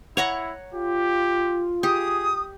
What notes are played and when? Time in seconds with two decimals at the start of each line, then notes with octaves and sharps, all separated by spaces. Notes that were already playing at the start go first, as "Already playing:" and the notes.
0.17 E4 C#5 F#5 A#5
0.74 F4 G4
1.83 G4 G#4 D#6